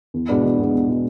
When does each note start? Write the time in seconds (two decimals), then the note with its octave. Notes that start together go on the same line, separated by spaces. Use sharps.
0.14 E2
0.29 B2 G#3 B3 D4
0.44 E2
0.59 B2 G#3 B3 D4
0.74 E2
0.88 B2 G#3 B3 D4